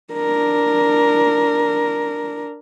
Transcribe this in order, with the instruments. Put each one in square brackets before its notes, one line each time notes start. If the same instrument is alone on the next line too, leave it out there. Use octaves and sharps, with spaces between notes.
[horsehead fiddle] D4 A#4